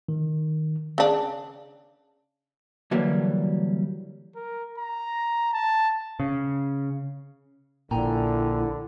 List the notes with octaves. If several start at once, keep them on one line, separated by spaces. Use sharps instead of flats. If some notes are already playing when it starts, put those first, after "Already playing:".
D#3
C#3 D4
D3 E3 F#3 G3 A#3
A#4
A#5
A5
C#3
A#1 A#2 D3 E4 G5 G#5 A#5